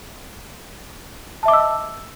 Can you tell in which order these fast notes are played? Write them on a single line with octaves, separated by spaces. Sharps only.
A5 E5 D6 D#5 E6